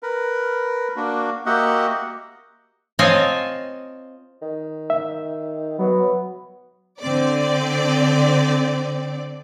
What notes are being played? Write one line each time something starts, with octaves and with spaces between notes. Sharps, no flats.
A#4 B4
A#3 D4 F#4
A#3 F#4 G4 D#5 E5 F#5
C4 F4 C#5 D#5 G#5 A5
D#3
E5
F#3 B3
D3 C4 D5